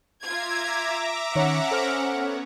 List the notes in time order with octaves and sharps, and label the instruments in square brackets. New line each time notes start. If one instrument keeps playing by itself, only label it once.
[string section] F4 G#6 [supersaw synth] E5 A#5 D6
[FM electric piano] D#3 C#5 [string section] C#4 F#5
[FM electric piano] A4 C5 F6
[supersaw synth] B3 C#5